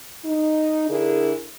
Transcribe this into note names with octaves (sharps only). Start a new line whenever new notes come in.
D#4
D3 D4 E4 G#4 A#4